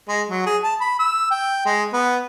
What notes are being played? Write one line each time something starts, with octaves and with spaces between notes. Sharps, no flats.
G#3
F#3
G#4
A5
B5
E6
G5
G#3
B3